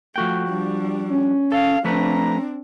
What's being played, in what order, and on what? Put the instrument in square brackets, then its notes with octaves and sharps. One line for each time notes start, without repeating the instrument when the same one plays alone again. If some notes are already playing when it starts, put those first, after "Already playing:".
[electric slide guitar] F3 F#4 G5 [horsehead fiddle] A3
[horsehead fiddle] G3 D4
[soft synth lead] C#4
[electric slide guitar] A4 [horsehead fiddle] F5
[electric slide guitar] F3 A3 B4 [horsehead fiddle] C4 D4 [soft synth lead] A#5